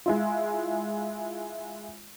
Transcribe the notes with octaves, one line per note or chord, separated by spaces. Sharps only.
G#3 E4 F4